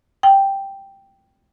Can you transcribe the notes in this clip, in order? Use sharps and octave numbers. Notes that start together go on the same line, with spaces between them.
G5